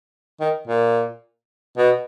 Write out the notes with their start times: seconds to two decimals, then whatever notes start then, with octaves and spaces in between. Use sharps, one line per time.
0.40 D#3
0.67 A#2
1.77 B2